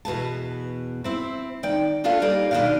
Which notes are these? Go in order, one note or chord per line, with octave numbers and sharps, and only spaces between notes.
E2 B2 B3 A5
C4 E4 C5
D#3 D5 G5
A3 B3 D4 F4 A4 F5
G3 A#3 D#4 D5
B2 D#3 C#4 D4 D5 F5